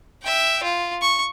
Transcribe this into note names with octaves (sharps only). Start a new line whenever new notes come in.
E5 G5
F4
C#6